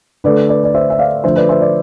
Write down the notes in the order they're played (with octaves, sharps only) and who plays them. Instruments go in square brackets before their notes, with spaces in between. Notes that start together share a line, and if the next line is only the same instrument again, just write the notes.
[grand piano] D3 A3 B4 D5
B4 D5
D5
C5 E5
E5
D5 F5
D3 F3 A3 C5 E5
B4 D5
C5 E5
B4 D5